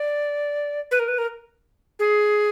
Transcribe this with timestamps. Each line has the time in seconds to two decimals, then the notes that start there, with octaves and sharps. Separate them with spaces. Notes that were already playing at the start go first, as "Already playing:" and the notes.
Already playing: D5
0.91 B4
0.99 A#4
1.08 B4
1.18 A#4
1.99 G#4